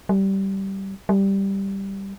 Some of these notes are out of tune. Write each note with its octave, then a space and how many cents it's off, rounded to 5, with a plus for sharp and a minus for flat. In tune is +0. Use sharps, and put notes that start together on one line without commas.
G3 -15
G3 +0